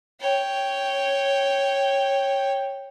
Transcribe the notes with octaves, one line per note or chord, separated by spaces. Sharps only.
C#5 G5